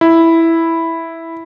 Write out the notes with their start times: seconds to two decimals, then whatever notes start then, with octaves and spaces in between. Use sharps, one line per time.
0.01 E4